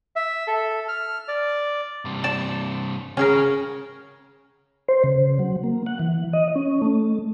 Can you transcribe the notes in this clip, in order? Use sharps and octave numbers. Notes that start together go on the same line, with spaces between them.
E5
A4
F6
D5
G2 C3
D5 A5
C#3 C#4 G#4 A#4
C5
C#3
F#3
A#3
F#5
E3
D#5
C#4
A3